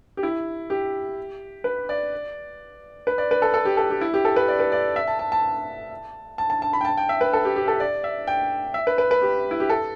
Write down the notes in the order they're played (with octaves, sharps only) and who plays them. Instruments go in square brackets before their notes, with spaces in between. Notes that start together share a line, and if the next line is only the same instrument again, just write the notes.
[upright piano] G4
E4
G4
B4
D5
B4
D5
B4
A4
A4
G4
A4
G4
E4
G4
A4
B4
D5
B4
D5
E5
A5
A5
A5
A5
A5
A5
B5
G5
A5
G5
E5
B4
A4
G4
G4
A4
D5
E5
G5
E5
B4
B4
B4
G4
E4
G4
A4